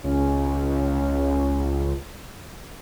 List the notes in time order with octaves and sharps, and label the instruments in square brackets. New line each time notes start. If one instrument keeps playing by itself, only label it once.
[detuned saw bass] C#2 [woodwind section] C#4